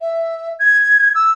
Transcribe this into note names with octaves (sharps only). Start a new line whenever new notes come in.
E5
G#6
E6